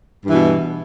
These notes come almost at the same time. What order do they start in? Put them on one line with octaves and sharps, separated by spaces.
G2 E3 B2